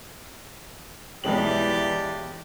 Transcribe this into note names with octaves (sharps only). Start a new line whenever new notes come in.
B1 E3 G#3 G4 D5 F#7